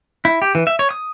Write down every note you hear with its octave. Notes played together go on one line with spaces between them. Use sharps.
E4
G4
E3
E5
C#5
D#6